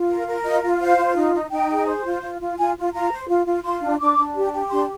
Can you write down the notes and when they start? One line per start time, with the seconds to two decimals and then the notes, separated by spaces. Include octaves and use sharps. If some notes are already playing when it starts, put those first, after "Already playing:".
Already playing: F4
0.09 A#4
0.27 A#4
0.45 F4 D#5
0.63 F4
0.80 C5 F5
0.97 F4
1.16 D#4
1.34 D#4
1.51 D#4 G5
1.69 G#4
1.87 C5
2.05 F4
2.22 F4
2.41 F4
2.57 F4 G#5
2.76 F4
2.93 F4 A#5
3.11 C5
3.28 F4
3.46 F4
3.64 F4 C6
3.82 D4
4.00 D4 D6
4.18 D4
4.35 G4
4.53 G4
4.71 D4 C6